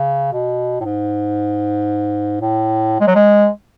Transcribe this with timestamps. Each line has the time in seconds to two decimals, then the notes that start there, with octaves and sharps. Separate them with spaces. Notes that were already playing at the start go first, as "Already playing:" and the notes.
Already playing: C#3
0.33 B2
0.80 A2
0.85 G#2
2.41 A2
3.01 G#3
3.07 F#3
3.15 G#3